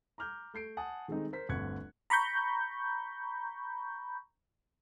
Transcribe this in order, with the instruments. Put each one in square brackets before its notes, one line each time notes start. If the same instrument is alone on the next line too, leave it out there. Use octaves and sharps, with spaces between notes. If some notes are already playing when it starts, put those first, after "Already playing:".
[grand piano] A#5 D6 F6 G6
A3 G6 C7 D7
F#5 G#5 A5 D#6
D#3 G#3 A3 C4 D#4
A#4 C5 B6
G1 D2 C4 F#6 G#6 C#7
[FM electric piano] A#5 B5 C#6 G6